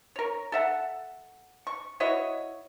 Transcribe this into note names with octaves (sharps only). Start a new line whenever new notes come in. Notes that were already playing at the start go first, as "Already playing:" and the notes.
A#4 C#5
A4 E5 F#5
C#6
E4 F#4 C#5 D#5